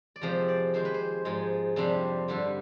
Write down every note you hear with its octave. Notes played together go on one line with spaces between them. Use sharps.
D5
F2 C3 F3 G#3 C5
D5
F2 D#3 G#3 C5
B4
C5
G#2 F3 G#3
F2 C3 G3 D4
G2 D3 G3